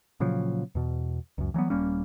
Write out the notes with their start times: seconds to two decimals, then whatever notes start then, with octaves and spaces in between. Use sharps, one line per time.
0.20 A#2 C#3 F3 F#3
0.75 E2 B2
1.38 C#2 F#2
1.54 E3 F#3 G3 B3
1.70 D#1 G3 A#3 C#4